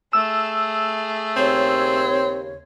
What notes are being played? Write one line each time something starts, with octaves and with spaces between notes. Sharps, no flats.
A3 G#4 E6
D#2 C#3 C4 C#5